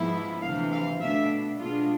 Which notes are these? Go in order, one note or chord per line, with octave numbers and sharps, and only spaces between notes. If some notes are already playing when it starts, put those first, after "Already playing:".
Already playing: G#2 F3 G#3 B3 E4
D2 C3 E3 F5
F5
B2 A3 D4 E5
B2 G#3 D4 F4